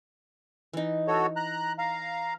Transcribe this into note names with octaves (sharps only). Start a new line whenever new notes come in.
E3 D#4
F#4 A4 C#5
A#5 F#6
F5 A#5